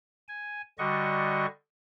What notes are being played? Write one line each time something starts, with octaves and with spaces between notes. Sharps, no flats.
G#5
D3 G3 F#4 D#5 C#6